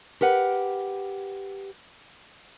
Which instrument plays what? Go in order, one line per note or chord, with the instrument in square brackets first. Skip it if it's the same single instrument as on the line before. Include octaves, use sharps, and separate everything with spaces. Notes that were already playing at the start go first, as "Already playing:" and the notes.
[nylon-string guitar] G4 A#4 B4 F#5